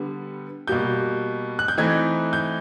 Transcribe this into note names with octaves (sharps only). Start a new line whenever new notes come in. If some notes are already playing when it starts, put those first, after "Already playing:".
Already playing: D3 G3 B3
B2 G3 A#3 G6
F#6
G6
E3 A3 C4 D#4 G#6
G6